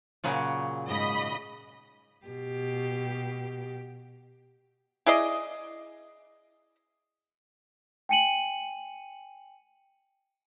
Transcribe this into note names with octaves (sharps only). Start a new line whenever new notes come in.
A#2 C#3 F#3
G#2 D#5 B5
B2 G4
E4 G#4 D5 D#5
G5 G#5 C#7 D#7 F#7